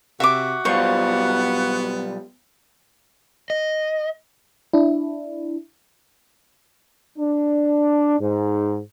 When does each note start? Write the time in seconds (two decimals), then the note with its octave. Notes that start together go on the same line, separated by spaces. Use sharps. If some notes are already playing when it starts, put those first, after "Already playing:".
0.20 C3 F#4 E5 D6
0.65 B1 G3 B3 F4 C5 C#6
3.50 D#5
4.73 D4 E4
7.17 D4
8.20 G#2